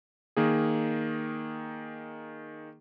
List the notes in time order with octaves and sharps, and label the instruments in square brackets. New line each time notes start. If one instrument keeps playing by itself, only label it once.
[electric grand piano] D#3 A#3 G#4